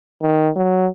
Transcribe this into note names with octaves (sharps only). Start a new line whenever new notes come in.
D#3
F#3